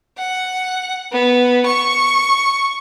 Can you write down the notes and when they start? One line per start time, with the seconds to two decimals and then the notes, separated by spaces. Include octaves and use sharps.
0.18 F#5
1.12 B3
1.65 C#6